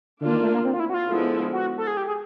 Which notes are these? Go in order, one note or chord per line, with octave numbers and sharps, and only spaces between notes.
D3 A#3 D4 F4
D#3
A3
A#3
C4
F4
E4
F#4
F4
D3 F3 G#3 B3 E4
F#4
A4
G#4
G4
G#4